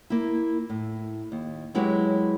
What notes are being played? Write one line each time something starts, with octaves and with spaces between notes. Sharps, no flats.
A#3 E4
A2
D#2
F#3 G#3 E4 G4 B4 C#5